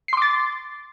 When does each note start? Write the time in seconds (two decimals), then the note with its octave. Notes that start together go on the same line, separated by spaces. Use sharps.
0.08 C7
0.13 C6
0.17 D6
0.22 A6